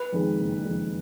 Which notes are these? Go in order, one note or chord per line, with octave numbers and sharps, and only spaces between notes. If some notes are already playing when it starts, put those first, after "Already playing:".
Already playing: B4
F2 D#3 G#3
F#1
F2 D#3 G#3